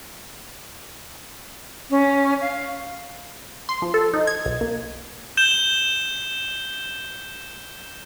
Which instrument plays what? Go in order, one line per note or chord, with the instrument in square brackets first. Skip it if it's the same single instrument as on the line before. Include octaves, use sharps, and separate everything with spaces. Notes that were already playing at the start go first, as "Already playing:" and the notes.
[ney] C#4
F5
[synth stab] C6
F3
A4
D#4
G#6
B1
A#3
[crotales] G6 E7 G7